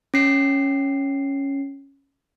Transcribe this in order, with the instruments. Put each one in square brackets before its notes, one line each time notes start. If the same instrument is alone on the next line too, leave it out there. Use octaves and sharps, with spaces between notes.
[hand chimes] C#4 C7